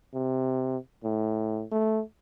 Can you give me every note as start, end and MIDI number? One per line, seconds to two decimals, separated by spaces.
0.14 0.77 48
1.04 1.64 45
1.72 2.02 57